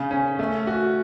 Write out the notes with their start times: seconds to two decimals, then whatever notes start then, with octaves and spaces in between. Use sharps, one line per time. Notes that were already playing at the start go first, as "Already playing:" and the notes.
Already playing: C#3
0.11 C#4
0.39 A3
0.67 F#4